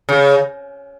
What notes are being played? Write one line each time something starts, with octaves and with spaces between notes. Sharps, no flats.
C#3